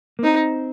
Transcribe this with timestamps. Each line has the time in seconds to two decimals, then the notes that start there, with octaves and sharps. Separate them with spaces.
0.19 A#3
0.23 C4 D#4